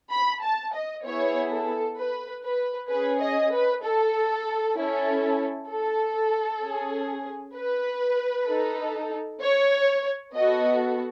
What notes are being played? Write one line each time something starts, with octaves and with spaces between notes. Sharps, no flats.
B5
A5
D#5
B3 E4 G#4 C#5
A4
B4
B4
C#4 G#4 B4
D#5
B4
A4
C#4 E4 A4
A4
C#4 G#4
B4
D#4 A4
C#5
B3 F#4 A4 D#5